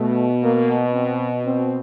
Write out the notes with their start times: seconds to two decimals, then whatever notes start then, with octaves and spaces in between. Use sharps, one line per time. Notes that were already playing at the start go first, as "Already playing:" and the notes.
Already playing: B2 A3
0.41 A#3
0.92 C4
1.43 C4